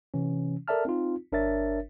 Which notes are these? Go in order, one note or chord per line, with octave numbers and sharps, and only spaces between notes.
C3 E3 C#4
A4 A#4 D5 E5 A5 F6
C4 D#4 F4
G1 D4 A#4 C#5 E5 A6